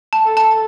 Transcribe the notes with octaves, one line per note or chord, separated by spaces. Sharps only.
A5
A4
A5